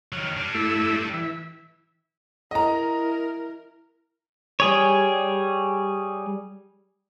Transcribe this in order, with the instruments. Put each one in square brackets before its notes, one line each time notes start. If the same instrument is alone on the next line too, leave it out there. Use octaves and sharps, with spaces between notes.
[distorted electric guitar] D#3 F#3 [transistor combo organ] F6
[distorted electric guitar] G3 D4
[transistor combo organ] A3 E4 E6
E3 E5
[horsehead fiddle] E4 A#4 [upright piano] D#5 A#5
[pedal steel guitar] G3 G#4 C#5